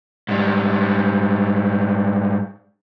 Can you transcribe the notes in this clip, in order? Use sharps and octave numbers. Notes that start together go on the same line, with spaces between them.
G#2 G3